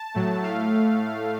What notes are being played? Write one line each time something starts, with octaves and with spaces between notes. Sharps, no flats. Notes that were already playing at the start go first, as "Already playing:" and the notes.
Already playing: A5
A2 F#3 A3
A2 A3 F5